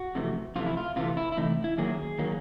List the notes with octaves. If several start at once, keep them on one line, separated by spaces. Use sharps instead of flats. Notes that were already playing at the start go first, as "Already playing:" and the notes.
Already playing: F#4
F2 C3 E3 A3
F2 C3 E3 A3 F4
E4
F4
C3 E3 A3 F4
E4
E4
C3 E3 A3 D#4
E4
F#2 D#3 F#3 A#3 G#4
D#3 F#3 A#3